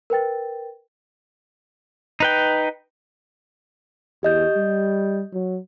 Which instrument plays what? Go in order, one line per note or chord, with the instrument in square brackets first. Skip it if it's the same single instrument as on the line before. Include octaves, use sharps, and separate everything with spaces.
[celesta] A#4 B4 G5 A6
[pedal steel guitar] D#4 B4 G5
[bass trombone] E2 [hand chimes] G4 D#5 G6
[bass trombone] G3
F#3